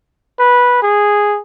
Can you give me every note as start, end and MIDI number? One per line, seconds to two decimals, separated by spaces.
0.39 0.77 71
0.82 1.40 68